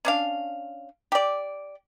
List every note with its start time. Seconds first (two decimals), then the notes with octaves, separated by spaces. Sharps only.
0.05 C#4 D4 F5
1.12 G4 D5